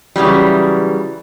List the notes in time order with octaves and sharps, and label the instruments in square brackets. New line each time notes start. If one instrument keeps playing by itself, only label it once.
[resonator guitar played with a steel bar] C#3 E3 F#3 G3